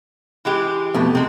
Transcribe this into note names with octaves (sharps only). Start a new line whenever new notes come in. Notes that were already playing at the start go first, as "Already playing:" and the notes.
E3 G#3 G4
F2 B2 A3
C3 G#3 C4